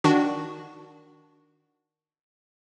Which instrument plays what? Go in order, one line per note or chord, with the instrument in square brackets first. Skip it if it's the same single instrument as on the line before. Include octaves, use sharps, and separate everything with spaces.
[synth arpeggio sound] D#3 D4 F#4